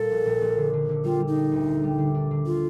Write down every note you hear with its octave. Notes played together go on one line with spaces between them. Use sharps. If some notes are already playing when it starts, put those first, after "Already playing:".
Already playing: A#2 G3 A4
A#1
A#1
A#1
D3
D3
D3
G3 F4
G3
D#4
D4
D2
D3
G3
D3
D4
D3
F4